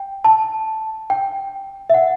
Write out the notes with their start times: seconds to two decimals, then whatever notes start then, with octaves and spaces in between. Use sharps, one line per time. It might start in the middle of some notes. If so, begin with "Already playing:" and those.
Already playing: G5
0.24 A5
1.10 G5
1.90 E5
1.94 F#5